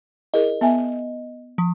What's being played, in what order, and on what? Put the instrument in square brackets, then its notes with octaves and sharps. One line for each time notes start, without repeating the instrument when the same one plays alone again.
[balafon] E4 G#4 A#4 [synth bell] D#5
[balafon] B3 E5 G#5
[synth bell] F3